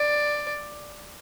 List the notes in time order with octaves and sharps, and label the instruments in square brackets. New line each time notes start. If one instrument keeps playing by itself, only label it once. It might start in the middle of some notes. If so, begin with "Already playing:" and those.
Already playing: [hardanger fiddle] D5